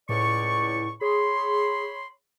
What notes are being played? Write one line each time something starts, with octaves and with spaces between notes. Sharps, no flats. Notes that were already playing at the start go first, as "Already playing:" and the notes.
C#2 A2 D5 C#6
G#4 C#5 B5 C6